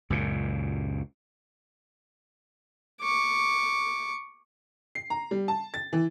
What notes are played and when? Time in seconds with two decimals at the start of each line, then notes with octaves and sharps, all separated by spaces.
0.10 C#2 F#2 A#2
3.01 C#6 D6
4.95 C7
5.10 A#5
5.31 G3
5.48 A5
5.74 A6
5.93 E3